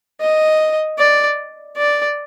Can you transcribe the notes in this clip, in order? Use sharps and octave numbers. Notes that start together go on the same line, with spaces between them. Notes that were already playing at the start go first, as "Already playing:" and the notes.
D#5
D5
D5